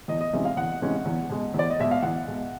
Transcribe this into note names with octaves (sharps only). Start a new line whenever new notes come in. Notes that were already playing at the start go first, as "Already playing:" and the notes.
E2 D#5
D#5
C3 E3 G#3 C#4 E5
F5
E2 F#5
C3 E3 G#3 C#4
E2
B2 G#3
E2 D5
D#5
B2 G#3 E5
F5
E2 F#5
B2 G#3